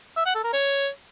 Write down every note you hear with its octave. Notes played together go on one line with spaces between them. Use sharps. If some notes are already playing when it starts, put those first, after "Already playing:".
E5
F#5
A4
A#4
C#5